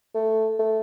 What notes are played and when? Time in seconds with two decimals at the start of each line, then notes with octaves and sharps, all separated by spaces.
0.15 A3
0.59 A3